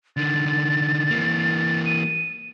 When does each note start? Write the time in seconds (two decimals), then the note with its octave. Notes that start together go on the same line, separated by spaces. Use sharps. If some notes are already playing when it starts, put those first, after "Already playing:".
0.17 D3 D#3 A6
1.10 E3 A#3
1.86 D#7